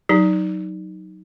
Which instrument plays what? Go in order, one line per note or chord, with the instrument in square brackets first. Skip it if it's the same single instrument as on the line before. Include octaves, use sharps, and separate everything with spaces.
[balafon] F#3 D#4